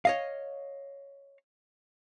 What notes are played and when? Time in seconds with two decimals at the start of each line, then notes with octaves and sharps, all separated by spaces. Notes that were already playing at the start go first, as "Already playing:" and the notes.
0.05 C#5 D#5 F5